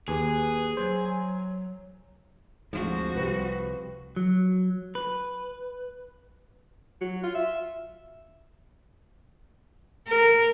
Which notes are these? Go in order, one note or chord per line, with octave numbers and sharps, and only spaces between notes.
D#2 G#4 B4
F#3 C5
D2 G#2 F3 C4 F#4
C2 G3 B4
F#3
B4
F#3
F4
E5
A#4